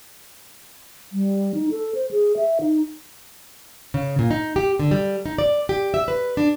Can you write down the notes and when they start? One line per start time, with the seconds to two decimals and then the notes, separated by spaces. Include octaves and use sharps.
1.13 G3
1.54 D#4
1.71 A4
1.95 C5
2.11 G#4
2.37 E5
2.61 D#4
3.94 C#3
4.19 A#2
4.31 D#4
4.56 G4
4.79 D3
4.91 G3
5.26 D#4
5.38 D5
5.69 G4
5.94 E5
6.08 B4
6.37 D4